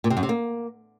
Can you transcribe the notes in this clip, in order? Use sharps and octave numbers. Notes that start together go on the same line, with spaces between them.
A#2
C3
F#2
C3
A#3